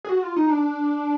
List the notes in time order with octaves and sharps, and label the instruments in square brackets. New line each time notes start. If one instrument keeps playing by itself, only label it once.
[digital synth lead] G#4
F#4
F4
D#4
D4